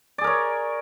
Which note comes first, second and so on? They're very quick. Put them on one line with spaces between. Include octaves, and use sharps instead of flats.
D5 G#4 A#4 C#5